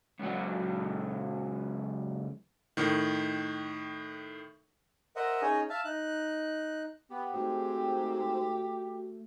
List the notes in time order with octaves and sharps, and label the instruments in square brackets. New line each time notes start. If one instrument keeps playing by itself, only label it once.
[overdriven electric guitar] C#2 F#3
[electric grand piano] A2 D#3
[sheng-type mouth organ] A#4 C5 D#5 E5 F#5
C#4 D#4 G#4 C#5 D#5
E5 F5 A5
D#4 F#6
[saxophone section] B3 [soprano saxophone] G4
[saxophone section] G#2 C4 [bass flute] A3 [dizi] F#4